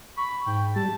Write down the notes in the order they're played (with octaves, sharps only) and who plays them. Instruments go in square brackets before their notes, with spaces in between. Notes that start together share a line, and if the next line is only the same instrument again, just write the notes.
[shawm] B5 [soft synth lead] C#6
[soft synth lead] G#2 [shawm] G5
[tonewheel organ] G3 [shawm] A5